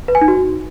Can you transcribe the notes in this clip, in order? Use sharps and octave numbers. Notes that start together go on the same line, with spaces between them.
B4
G#5
D#4
F#4